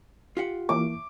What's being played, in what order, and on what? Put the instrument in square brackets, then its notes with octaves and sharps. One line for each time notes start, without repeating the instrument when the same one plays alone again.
[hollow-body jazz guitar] F4 G4 F#5
[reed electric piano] E3 A#3 E4 [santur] D6